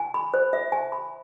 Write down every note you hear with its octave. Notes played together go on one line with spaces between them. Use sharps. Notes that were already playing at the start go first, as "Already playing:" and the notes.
Already playing: G#5
B5
C5
E5
G#5
B5